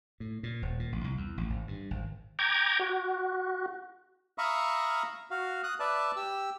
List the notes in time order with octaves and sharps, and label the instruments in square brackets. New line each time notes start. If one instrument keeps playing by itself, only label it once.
[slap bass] A2
A#2
D#1
A#2
A1
C2
E2
A1
G#1
G2
G#1
[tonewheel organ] G5 A#5 D6 G#6
F#4
[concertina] E5 F5 A#5 B5 C#6 D#6
F#4 F5
D#6 F#6
B4 D5 E5 A5
G4 E6